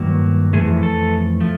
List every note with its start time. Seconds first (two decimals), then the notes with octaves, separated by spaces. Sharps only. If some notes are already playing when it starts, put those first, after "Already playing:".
Already playing: G2 D#3 F#3 A#3
0.53 F2 C3 E3 A3 G#4
0.83 A4
1.41 F3 A3